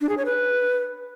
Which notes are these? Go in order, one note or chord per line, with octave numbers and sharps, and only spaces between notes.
D4
G#4
C#5
B4